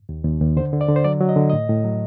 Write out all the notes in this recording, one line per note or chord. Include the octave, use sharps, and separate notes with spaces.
D#2
D#2
D#2
D3 C5
D3
D5
D3
C5
F#3 D5
F#3
D#5
D3
A2 D#5
A2
F#3